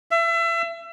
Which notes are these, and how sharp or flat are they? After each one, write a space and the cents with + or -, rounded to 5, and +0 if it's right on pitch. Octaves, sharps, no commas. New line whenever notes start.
E5 +30